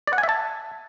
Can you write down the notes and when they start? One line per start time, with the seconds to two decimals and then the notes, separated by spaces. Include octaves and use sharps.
0.07 D5
0.13 F#5
0.18 G#5
0.23 E5
0.29 A5